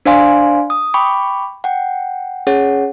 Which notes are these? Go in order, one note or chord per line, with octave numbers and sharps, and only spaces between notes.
D4 C5 D5 F5 G#5 C6
D#6
G5 B5 C#6 D6
F#5 G5
C#4 G#4 C#5 F#5